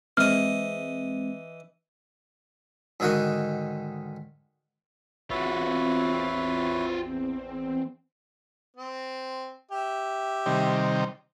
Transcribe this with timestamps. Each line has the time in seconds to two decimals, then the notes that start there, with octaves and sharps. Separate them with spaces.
0.17 E3 G#3 C4 D#5 F6
3.00 G#2 D3 D#3 F#4 G5 G#5
5.30 A1 E2 C4 F4 F#4 B4 C#5 E5
8.77 C4
9.71 G4 E5
10.46 C3 D#3 G3